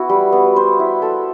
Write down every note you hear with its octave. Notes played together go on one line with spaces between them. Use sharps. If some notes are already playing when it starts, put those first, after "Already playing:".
Already playing: B3 E4 F#4
G3
B3
C5
E4
A4